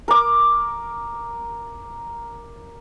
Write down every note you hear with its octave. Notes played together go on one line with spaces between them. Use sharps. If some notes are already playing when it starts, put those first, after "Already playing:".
A#4 D6